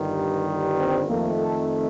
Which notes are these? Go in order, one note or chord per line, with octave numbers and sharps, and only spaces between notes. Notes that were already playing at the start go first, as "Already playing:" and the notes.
Already playing: G1 G2 D#3 G3
C4
F2 D#3 A3 A#3
A4